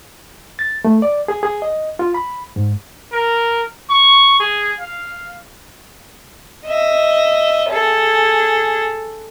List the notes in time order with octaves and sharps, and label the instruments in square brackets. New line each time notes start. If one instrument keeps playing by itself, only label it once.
[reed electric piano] A6
A3
D5
G#4
G#4
D#5
F4
B5
G#2
[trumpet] A#4
C#6
G#4
F5
[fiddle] D#5 E5
G#4 A4